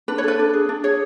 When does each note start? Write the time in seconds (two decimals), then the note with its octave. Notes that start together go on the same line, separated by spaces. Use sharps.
0.08 D4 B4
0.18 C#5
0.24 A4 B4
0.39 D4
0.53 G#4
0.69 D4
0.84 G#4 C#5